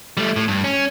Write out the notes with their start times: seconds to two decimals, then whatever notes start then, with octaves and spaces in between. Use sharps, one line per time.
0.17 G3 A3
0.36 A2
0.48 G2
0.64 C#4